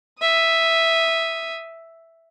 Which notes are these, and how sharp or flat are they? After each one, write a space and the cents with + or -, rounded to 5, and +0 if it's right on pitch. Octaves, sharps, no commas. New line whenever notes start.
E5 +0 D#6 -5